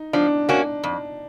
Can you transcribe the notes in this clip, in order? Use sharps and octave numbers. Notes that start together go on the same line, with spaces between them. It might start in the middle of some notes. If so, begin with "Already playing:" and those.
Already playing: D#4
F3 D4
A#3 C#4 F#4
F2